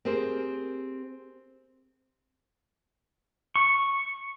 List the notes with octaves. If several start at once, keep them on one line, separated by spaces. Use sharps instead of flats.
C4 G4 G#4 A#4 C5
C#6